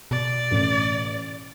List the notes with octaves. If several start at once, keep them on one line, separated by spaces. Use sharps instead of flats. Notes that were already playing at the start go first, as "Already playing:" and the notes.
B2 D5
A1 A2